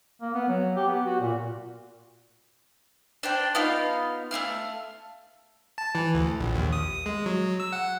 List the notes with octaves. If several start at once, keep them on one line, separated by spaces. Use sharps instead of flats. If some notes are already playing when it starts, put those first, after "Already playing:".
A#3
B3
F#3
G4
B3
F#4
A#2
D4 C5 G5
B3 D#4 F4 F5
A3 C#4 F5 F6
A5
E3
D2
A#1
D#2
D#6
G#3
F#3
E6
F#5